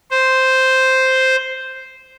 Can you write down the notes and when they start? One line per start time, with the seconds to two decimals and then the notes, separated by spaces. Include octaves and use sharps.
0.11 C5